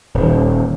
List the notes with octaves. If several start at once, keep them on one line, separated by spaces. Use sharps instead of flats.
D#1